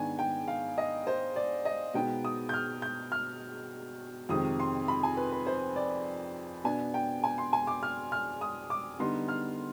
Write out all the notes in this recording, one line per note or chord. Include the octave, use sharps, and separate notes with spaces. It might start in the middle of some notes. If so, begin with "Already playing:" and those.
Already playing: G#2 D#3 B3 D4 G#5
G5
F5
D#5
C5
D5
D#5
B2 G#3 B3 D#4 G5
D#6
G6
F6
G6
F6
F2 C3 D#3 G#3 C4 D#6
C6
B5
G#5
B4
B4
C5
D5
B2 B3 D4 G#5
G5
G#5
C6
G#5
D6
F6
F6
D#6
D6
D3 G3 B3 D#4 C6
F6